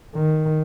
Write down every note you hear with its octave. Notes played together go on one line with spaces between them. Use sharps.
D#3